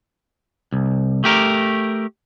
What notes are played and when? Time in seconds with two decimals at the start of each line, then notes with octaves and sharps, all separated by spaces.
0.72 C2
1.24 A3 G4 A#4